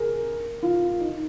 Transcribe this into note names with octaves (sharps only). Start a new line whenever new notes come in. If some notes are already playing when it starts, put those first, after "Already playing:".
Already playing: G#4 A#4
F4
D#4